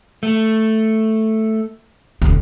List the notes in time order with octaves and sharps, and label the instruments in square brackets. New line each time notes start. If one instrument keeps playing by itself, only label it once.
[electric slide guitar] A3
[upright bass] E1 D2